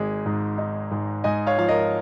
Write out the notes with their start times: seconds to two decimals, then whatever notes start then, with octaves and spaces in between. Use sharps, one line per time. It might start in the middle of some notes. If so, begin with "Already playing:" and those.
Already playing: G#1 G#3
0.26 G#2
0.58 D#4
0.91 G#2
1.24 G#2 D#5 G#5
1.47 C#5 F5
1.58 F3 F5
1.69 A#4 D#5